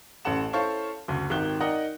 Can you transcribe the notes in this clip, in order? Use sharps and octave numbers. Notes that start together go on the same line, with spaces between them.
A1 C#4 A4 F#5 E7
E4 A4 C5 C#5 F5
F#1 D2
G#1 D#3 G4 F#6 G7
D#4 A#4 D5 D#5 F#5 G5